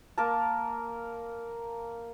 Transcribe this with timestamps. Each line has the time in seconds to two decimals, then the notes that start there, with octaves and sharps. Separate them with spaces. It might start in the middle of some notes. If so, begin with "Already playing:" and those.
0.18 A#3 A#4 A5